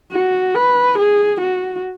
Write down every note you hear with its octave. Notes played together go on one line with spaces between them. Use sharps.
F#4
B4
G#4
F#4